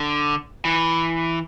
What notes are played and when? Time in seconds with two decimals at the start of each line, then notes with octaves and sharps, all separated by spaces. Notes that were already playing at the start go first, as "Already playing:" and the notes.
Already playing: D3
0.65 E3